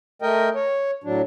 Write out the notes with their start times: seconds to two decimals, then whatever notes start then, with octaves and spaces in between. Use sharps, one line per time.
0.22 A3 A#4 D#5 G5
0.55 C#5
1.04 A2 F#3 D4